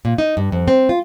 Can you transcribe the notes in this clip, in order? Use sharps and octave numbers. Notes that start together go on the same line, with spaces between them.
A#2
D#4
G2
F2
C4
F4